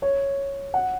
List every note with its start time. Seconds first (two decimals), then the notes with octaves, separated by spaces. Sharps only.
0.02 C#5
0.74 F#5